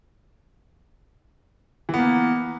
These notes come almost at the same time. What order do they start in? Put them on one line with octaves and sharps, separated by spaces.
E3 B3 A#3